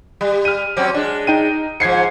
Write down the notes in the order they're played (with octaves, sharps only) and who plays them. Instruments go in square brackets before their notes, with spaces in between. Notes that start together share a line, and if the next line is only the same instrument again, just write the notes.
[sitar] G3
[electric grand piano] F6 D#7
[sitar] F#3 C4 C#4
G#3 D4
[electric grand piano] D#4 G5 D#7
[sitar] G#2 F3 [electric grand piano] G#6 C7 C#7